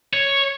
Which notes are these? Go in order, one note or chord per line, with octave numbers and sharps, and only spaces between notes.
C#5